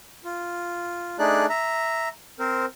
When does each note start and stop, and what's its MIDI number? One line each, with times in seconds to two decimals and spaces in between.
0.25 1.17 65
1.19 1.46 57
1.19 1.46 62
1.19 1.46 63
1.19 1.46 68
1.19 1.46 74
1.19 1.46 90
1.49 2.09 76
1.49 2.09 82
2.39 2.66 60
2.39 2.66 70
2.39 2.66 72